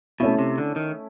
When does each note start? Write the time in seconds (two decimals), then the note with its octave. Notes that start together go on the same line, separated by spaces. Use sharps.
0.20 B2 A3 C#4 E4
0.39 C3
0.58 D3
0.76 D#3